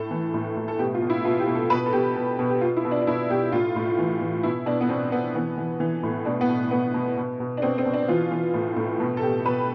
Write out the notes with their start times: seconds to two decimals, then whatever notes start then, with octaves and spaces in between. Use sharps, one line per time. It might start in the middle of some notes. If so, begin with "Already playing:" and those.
Already playing: A2 A4
0.11 E3
0.34 A2
0.57 A2
0.68 A4
0.79 B2 G4
0.94 F4
1.02 B2
1.10 E4
1.24 B2 F4
1.40 G4
1.47 B2
1.55 A4
1.70 B2 B4
1.86 A4
1.93 B2 G4
2.16 B2
2.39 B2
2.50 G4
2.61 B2 F4
2.77 E4
2.85 B2
2.91 D4
3.02 D4
3.07 B2 E4
3.30 B2 G4
3.52 A2 F4
3.76 A2
3.98 E3
4.21 E3
4.43 B2 E4
4.66 B2 D4
4.81 B3
4.89 B2 C4
5.12 B2 B3
5.35 E3 B3
5.58 E3
5.80 E3
6.03 A2
6.25 B2 D4
6.41 B3
6.49 B2
6.71 B2 B3
6.94 B2
7.17 B2
7.40 B2
7.57 D4
7.62 B2 C4
7.78 C4
7.85 B2
7.93 D4
8.08 E3 F4
8.31 E3
8.54 A2
8.76 A2
9.00 B2
9.17 A4
9.22 B2 G4
9.45 B2 B4